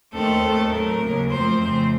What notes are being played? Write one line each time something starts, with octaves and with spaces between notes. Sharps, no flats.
D#2 D#3 A3 C4 A4
D#2 D#3 A3
A2 F#3 A3 C4 A#4
D#2 C#3 F#3 A#3
F#2 F3 A3 C4 C5
F2 C#3 A3 C4 C5